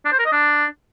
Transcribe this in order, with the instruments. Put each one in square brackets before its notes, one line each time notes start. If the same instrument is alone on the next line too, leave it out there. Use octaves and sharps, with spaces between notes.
[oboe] D4
C5
A#4
D#5
D4